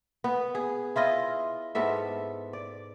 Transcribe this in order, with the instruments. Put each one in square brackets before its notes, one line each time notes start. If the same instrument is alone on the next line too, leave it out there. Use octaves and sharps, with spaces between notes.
[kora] B3
G#4
E4 F4 D#5
G#2 B3 A4 E5
D5